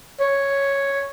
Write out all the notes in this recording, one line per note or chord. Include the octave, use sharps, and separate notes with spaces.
C#5